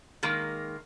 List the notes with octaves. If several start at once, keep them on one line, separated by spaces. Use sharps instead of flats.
D#3 G#3 A#3